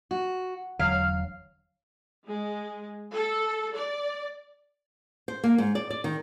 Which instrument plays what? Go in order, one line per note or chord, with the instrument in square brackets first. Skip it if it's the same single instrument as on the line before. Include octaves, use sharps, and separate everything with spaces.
[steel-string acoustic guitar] F#4
[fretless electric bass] E1 D3 [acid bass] F#3 [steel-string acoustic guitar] F5 [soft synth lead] F6
[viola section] G#3
A4
D5
[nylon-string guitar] C5
A#3
G#2
D5
D5
D#3